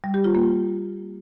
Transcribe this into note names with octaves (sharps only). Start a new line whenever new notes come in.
G3
G4
F4
A#3